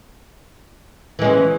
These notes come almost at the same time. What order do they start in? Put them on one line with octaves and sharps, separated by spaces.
E3 G#3 C#4